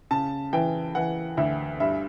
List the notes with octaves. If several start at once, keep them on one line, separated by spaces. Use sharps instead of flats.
C#3 A5
E3 G5
E3 F#5
D2 E5
G2 E5